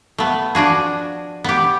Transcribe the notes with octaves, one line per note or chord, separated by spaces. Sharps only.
A3 B3
F3 D4 F#4 G#4
B3 G4